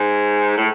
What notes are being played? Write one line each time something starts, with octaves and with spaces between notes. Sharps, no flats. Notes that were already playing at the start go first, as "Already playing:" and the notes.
Already playing: G#2
A2